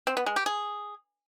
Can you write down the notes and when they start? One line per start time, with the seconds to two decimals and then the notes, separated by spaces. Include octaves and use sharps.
0.07 C4
0.17 B3
0.26 G#3
0.36 G4
0.46 G#4